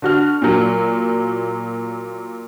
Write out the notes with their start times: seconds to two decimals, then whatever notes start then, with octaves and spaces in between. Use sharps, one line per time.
0.02 D3 F#4 F6
0.42 A#2 F#3